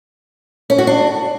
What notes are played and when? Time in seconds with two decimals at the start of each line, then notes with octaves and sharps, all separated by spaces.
0.70 C#4
0.78 F#4
0.87 D4